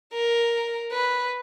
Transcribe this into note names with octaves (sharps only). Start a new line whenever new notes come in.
A#4
B4